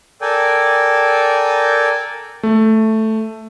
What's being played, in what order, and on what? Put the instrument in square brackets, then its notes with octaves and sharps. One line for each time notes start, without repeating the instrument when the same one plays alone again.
[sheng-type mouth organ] A4 A#4 D5 G5 G#5
[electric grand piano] A3